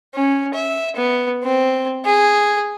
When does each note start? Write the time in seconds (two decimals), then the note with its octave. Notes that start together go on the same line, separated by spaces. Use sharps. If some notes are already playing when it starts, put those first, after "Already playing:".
0.14 C#4
0.54 E5
0.96 B3
1.44 C4
2.05 G#4